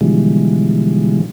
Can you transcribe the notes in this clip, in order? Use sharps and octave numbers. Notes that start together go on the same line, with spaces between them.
B2 D3 E3 F3 G3 G#3